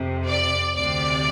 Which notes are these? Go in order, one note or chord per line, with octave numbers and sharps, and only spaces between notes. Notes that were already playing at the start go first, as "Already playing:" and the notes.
Already playing: F2 C3
D5
D2 C3 D5